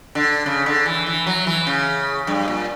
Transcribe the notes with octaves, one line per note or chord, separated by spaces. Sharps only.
D3
C#3
D3
E3
E3
F#3
E3
C#3
G2
A#2